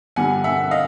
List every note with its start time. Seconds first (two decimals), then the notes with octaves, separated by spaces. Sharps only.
0.16 G2 D3 G3 F#5 G#5
0.44 E5 F#5
0.71 D#5 F5